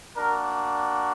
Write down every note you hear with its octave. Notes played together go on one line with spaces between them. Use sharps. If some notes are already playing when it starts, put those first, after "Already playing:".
A#3 D4 F#4 A#4